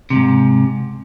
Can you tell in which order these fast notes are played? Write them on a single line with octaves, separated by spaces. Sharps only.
C3 E2 G#2